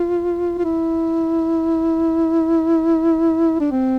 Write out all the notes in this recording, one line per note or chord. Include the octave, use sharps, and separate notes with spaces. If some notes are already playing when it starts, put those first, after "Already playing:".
Already playing: F4
F4
E4
D4
C4